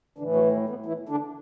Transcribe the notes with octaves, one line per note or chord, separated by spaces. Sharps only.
A2 D3 E3 D4
F#3 F#4
E3 E4
B3
E3 E4
D3 D4